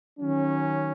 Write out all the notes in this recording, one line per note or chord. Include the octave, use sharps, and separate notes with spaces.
D#3 F#3 C#4